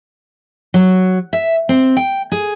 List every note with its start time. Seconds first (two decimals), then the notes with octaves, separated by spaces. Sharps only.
0.74 F#3
1.33 E5
1.69 C4
1.97 G5
2.32 G#4